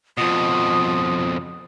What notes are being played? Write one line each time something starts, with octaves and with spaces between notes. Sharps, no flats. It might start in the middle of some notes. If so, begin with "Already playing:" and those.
F2 B2 F4 D#6